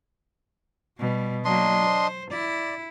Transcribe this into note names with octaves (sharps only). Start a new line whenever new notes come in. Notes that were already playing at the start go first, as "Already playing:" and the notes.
B2 G3
F#3 A#3 D4 D#5 C6
C5
E4 D5